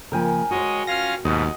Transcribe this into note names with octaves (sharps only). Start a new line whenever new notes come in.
C#3 F3 A#3 A#4 G5 G#5
G#3 F#4 C5 C#5 D#5
C#4 F4 F5 F6 A#6
D#2 G#2 B2 D#5 F#5